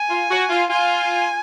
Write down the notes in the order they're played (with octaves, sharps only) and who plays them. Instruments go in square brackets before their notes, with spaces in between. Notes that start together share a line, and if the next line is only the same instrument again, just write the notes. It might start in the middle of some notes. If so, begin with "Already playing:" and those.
Already playing: [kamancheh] G#5
[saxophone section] F4
F#4
F4
[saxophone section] F4 [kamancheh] G#5